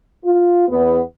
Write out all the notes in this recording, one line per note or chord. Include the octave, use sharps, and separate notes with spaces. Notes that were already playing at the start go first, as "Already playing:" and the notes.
F4
E2 B3